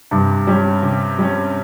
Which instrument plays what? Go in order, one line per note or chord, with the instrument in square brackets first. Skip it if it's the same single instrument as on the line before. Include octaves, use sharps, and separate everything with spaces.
[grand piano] G2 [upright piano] C3
[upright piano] G3 C#4
C3
G3 C#4